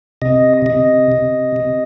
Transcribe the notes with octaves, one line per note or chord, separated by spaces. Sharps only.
C3 D#5
C3 D#5
C3
C3